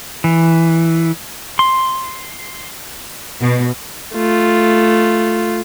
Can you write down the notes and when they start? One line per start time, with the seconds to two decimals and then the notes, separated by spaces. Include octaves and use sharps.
0.24 E3
1.59 C6
3.41 B2
4.14 A3 F4